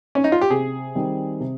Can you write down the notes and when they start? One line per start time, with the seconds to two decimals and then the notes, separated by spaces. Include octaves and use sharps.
0.15 C#4
0.24 D#4
0.32 F4
0.41 G4
0.50 C3 G#4
0.95 D#3 G3 C4
1.40 C3